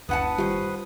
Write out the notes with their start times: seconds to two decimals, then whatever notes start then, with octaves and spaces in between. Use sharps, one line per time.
0.09 F#1 D2 G2 B4 F#5 A5 D#6
0.38 D#3 G3 F4 G4 C5